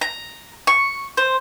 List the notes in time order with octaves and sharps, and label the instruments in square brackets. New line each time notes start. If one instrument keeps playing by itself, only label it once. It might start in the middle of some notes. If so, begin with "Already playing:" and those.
[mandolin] A#5
C#6
C5